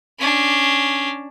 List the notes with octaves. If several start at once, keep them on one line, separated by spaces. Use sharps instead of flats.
C#4 D4